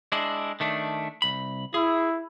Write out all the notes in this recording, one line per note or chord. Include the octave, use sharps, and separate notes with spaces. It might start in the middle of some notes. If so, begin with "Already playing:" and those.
G#3 D4 E4
D#3 A3 D4
C2 B5
E4 G#4